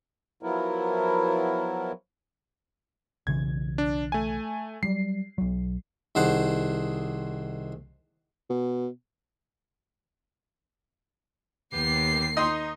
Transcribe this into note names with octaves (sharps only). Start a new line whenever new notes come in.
F3 F#3 B3 E4 A#4
B1 C#3 E3 G#6
D4
A3 G#5
F#3 G3 C7
B1 F#3
C2 D#3 G#4 C5 F#5 A5
B2
D#2 B3 G4 C7
D#4 D#5 C6